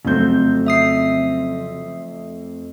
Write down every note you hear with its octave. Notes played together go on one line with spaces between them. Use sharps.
F2 C#3 F#3 A3 C4 G6
E5 D#6 C7